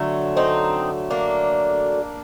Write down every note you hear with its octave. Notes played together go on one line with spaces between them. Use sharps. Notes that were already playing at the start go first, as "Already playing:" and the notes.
Already playing: D3 F#3 A3
C4 D#4
A#3 D4